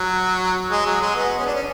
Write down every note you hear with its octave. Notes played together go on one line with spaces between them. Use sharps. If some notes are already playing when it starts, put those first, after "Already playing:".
Already playing: F#3
G#3
F#3
G#3
B3
C#4
D4
C#4